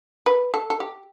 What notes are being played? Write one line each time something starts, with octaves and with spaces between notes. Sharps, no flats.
B4
A4
A4
G4